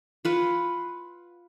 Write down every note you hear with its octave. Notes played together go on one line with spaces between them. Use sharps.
F4 B4 F#5